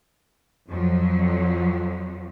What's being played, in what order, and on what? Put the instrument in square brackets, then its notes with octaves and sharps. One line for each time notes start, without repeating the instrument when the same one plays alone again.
[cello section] F2 F3 F#3